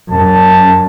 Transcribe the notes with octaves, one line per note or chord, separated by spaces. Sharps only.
F#2 A5